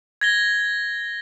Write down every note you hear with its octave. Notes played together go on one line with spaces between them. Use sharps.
G#6 A#6 G7